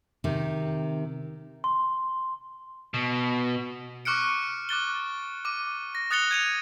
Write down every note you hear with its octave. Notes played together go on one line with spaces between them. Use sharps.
C3 D#3
C6
B2
C#6 D6 F6 F#6 C#7 D7
D6 F#6 A6 G7
D6 D#7
A#6
D#6 F#6 A6 C#7 F7 G7
G#6 D#7 F7